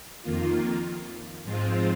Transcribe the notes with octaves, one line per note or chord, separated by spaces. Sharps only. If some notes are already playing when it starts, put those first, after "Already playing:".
F2 D#3 A#3 F4
G#2 F3 G#3 C4 F4